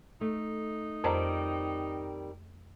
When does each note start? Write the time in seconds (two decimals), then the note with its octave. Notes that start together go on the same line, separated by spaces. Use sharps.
0.21 A3 D#4
1.04 F2 D#3 G3 C4 C5 A#5